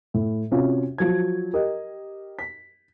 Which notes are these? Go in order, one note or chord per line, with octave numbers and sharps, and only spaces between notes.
A2
C3 C#4 F4 F#4
F3 F#3 G#6
G4 A#4 D#5
B6